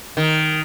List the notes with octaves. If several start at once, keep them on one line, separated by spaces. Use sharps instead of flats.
D#3